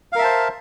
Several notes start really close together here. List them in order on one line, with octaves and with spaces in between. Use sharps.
F5 A#4 E5 A5 C5